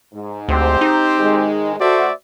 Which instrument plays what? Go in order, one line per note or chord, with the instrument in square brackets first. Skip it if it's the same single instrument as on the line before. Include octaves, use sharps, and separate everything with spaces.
[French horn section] G#2
[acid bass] D2 [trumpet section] C4 G4 C5
[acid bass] D#4
[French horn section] G#2 D#3 G#3
[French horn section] A3 F#4 [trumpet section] C5 D5 E5